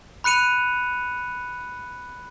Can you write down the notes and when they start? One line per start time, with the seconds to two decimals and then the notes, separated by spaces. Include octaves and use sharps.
0.24 B5 F#6 C#7 D#7 F7